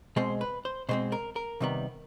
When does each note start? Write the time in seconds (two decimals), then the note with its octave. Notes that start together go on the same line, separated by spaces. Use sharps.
0.16 B2 G#3 C4 C5
0.41 B4
0.65 C5
0.89 B2 G#3 C4 C5
1.12 A#4
1.36 A#4
1.61 C3 D#3 G3 B3